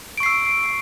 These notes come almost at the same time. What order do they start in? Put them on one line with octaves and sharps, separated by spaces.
D7 C#6 C7 E6